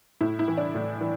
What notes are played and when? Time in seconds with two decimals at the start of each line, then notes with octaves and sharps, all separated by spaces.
0.21 A2 E4
0.39 E4
0.48 E3
0.57 D4
0.75 A2
1.01 E3